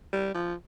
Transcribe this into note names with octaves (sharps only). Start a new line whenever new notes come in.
G3
F3